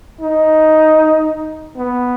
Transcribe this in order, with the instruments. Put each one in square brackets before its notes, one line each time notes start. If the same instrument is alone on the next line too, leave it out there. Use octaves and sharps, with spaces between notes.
[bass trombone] D#4
B3